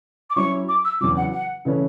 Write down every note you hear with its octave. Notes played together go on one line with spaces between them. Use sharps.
D6
F#3 C#4 E4 C#6
D6
E6
E2 C#3 F#3 D6
F#5
F#5
C#3 E3 A3 C#4 B4